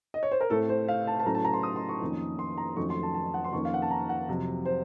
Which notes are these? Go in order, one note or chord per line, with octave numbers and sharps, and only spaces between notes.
D#5
C#5
C5
A#4
A2 A3 C4 A4
C5
F5
A5
A5
A2 F#3 A3 C#4 A#5
A5
A#5
C6
D#6
C6
C#6
F2 D#3 A#3 C#4
C6
A#5
F2 D#3 F#3 A3 C#4 C#6
C6
A5
A5
F#5
C6
F2 D#3 A#3 C#4 C#6
F5
F#5
A5
A#5
F#5
F2 C3 F#3
C5